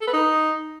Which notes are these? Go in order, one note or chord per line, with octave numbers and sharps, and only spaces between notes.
A4
B4
D#4